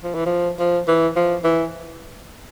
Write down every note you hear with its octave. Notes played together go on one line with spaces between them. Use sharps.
F3
E3
F3
F3
E3
F3
E3